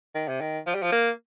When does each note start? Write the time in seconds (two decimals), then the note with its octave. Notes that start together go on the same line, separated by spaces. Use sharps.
0.15 D#3
0.28 C3
0.41 D#3
0.66 F3
0.75 G3
0.83 F3
0.92 A#3